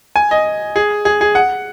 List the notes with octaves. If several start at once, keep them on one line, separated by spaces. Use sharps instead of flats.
G#5
D#5
G#4
G#4
G#4
F#5